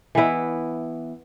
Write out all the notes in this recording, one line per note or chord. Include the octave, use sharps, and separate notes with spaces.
E3 B3 E4